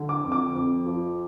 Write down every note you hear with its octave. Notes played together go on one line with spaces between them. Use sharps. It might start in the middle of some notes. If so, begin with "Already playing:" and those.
Already playing: D3
D6
F2
D6
F2
F3